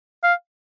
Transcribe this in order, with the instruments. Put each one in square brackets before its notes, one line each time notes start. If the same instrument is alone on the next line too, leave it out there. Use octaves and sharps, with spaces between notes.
[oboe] F5